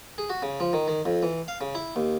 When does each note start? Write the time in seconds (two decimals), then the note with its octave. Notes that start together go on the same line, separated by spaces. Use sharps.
0.18 G#4
0.30 F#4
0.43 C#3
0.60 F3
0.73 D#3
0.88 D#3
1.05 F2
1.23 E3
1.48 F5
1.61 C#3
1.75 E4
1.96 D#2